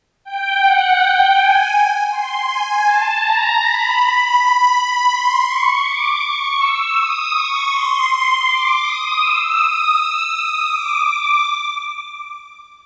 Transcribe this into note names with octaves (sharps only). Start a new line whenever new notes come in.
G5
F#5
G5
G#5
C6
G#5
A5
A#5
B5
C6
C#6
D6
C#6
E6
D#6
C#6
C6
D6
D#6
E6
D#6
E6
D#6
D6
D6